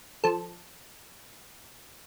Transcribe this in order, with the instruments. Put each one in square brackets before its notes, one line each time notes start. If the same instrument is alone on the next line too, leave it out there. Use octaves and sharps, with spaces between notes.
[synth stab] F3 A4